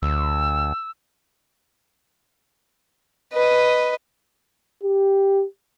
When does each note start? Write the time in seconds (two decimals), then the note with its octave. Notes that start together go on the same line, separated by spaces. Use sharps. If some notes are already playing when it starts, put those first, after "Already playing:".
0.02 D2 E6
3.33 B4 D#5
4.83 G4